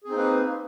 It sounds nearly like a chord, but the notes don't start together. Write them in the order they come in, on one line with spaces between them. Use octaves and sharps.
G#4 C4 D#4 A#3 B4